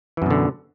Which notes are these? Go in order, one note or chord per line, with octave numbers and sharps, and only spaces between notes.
F#2 B2 D3 E3